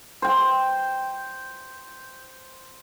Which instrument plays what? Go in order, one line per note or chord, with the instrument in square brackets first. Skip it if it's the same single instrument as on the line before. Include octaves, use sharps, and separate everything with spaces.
[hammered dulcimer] C5 G5